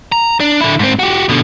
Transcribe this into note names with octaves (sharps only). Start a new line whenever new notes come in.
A#5
D4
D3 E4
G#2 C4
F#4 G4
B2 D3